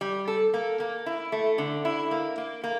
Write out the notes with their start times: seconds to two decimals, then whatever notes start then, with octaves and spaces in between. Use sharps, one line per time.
0.01 G3
0.27 A4
0.54 A#3
0.80 A#3
1.06 E4
1.32 A3
1.58 D3
1.85 E4
2.11 A#3
2.38 A#3
2.64 A#3